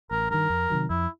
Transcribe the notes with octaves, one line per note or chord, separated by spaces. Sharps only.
A1 A#4
G2 D#3 A#4
F2
C3 D#3 F#3
F2 E4